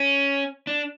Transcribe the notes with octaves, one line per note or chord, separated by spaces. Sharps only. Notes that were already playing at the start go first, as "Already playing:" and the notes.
Already playing: C#4
D4